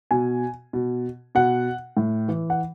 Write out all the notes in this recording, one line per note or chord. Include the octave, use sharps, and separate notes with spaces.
B2 G#5
B2
B2 F#5
A2
E3
F#5